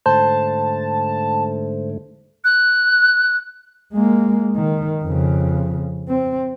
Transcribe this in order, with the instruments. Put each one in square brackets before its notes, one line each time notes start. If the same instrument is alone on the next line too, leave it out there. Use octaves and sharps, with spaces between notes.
[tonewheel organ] G#2 D3 A3 [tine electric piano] C5 [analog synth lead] A5
[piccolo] F#6
[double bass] G#3 A#3
D#3
F2 C#3
C4